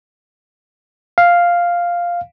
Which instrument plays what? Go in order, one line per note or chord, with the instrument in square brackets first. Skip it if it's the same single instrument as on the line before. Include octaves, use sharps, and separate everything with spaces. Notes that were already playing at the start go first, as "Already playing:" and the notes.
[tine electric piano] F5